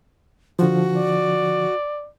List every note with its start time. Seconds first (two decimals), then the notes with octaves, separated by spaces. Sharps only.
0.59 D3 F3 F#4
0.97 D5